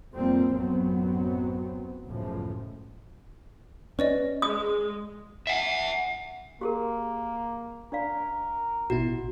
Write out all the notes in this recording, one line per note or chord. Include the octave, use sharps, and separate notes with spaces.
F2 A2 F3 G3 A#3 C4
A1 F#2 F#3 B3 C4
C#2 F#2 A2 C#3 F3
C#4 B4 D5 D#5
G#3 D#6
E5 F#5
A#3 G4 G#4 A#4
D4 A#4 D5 F5
A1 B2 E4 F#4